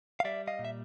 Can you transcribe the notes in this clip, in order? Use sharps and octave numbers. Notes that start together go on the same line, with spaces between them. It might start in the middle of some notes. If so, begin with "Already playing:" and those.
F5
G3 D5 E5
D#5 F5
A#2
E5